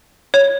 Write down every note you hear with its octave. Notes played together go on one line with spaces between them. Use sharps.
C#5